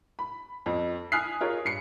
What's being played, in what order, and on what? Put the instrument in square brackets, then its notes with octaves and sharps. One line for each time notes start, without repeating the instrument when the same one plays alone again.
[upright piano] B5
F2
G#5 D#6 F6 F#6 B6 C7
F4 G#4 A#4 C#5
G2 C7 C#7